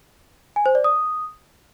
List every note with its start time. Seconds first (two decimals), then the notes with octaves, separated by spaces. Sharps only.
0.56 G#5
0.66 C5
0.75 D5
0.84 D#6